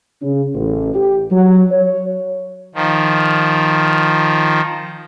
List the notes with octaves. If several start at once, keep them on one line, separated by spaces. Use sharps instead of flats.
C#3
A1
G4
F#3
C#5
D#3 F3